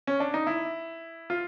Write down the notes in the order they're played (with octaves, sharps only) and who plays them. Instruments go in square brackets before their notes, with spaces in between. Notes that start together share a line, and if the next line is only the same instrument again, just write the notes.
[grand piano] C#4
D4
D#4
E4
F4